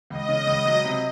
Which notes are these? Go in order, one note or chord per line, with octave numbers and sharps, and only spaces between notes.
C#2 D#5
C#3
C#2
F#3
C3